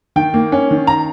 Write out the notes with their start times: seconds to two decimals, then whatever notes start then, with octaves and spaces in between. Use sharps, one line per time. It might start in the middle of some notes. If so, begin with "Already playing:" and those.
0.16 D#3 G5
0.34 A#3
0.52 C#4
0.71 D#3
0.87 A#5